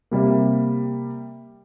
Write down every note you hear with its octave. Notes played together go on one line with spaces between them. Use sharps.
C3 G3 A#3